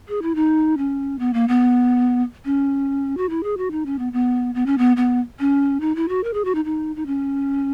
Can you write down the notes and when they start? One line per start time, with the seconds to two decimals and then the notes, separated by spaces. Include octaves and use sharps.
0.08 G#4
0.22 E4
0.35 D#4
0.77 C#4
1.19 B3
1.34 A#3
1.48 B3
2.45 C#4
3.17 F#4
3.30 E4
3.43 G#4
3.57 F#4
3.71 D#4
3.86 C#4
3.99 B3
4.13 B3
4.55 B3
4.66 C#4
4.78 B3
4.97 B3
5.40 C#4
5.81 D#4
5.96 E4
6.09 F#4
6.24 A#4
6.34 G#4
6.45 F#4
6.55 D#4
6.65 D#4
6.96 D#4
7.06 C#4